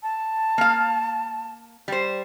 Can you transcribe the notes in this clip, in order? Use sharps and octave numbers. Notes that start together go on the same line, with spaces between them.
A5
A#3 F5
G3 C5